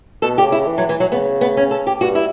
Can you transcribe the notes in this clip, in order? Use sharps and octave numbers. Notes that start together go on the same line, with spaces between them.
B2 A4
D3 G4
C#3
E4
E3
F#3
E3
F#3
C#3 B3
B3
C#4
A4
G4
G2 F#4
E4